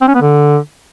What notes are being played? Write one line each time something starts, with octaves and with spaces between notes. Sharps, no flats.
C4
C#4
B3
D3